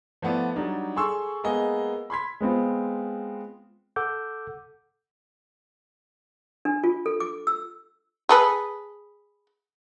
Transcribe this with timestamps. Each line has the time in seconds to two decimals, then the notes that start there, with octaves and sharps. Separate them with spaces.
0.22 F3 A3 B3 E4 D5
0.56 F#3 G3 D4 D#4 G4
0.96 G#4 A4 C6 C#6 E6
1.44 G#3 A#3 B3 G#4 D#5
2.10 B5 C6 G#6 B6
2.40 G#3 B3 C4 F4
3.96 A4 F#5 D6 E6 G6
6.65 D4
6.84 F4
7.06 A4
7.20 D6
7.47 E6
8.29 G#4 A4 B4